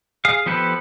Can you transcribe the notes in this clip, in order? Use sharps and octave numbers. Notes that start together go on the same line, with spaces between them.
G#4 F5
F3 B3 G4 A4 B4